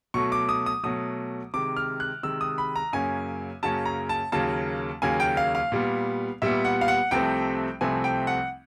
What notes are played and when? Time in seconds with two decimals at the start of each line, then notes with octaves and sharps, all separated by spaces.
0.14 B2 F#3 A3 C#6
0.32 D6
0.49 D#6
0.66 D#6
0.83 B2 F#3 A3 D#6
1.54 C3 D#3 G#3 D6
1.77 F6
2.00 F#6
2.23 C3 D#3 G#3 E6
2.41 D#6
2.58 B5
2.76 A#5
2.93 F#2 C#3 F#3 A#3 C#4 G#5
3.63 F#2 C#3 F#3 A#3 C#4 A5
3.86 A#5
4.09 A5
4.32 D#2 C#3 F#3 A#3 A5
5.02 D#2 C#3 F#3 A#3 G#5
5.20 G5
5.37 F5
5.55 F5
5.72 A#2 G3 B3
6.42 A#2 G3 B3 E5
6.65 F#5
6.81 F5
6.88 F#5
7.11 C2 C3 F3 A3 C4 G5
7.81 C2 C3 F3 A3 C4 G#5
8.04 G5
8.27 F#5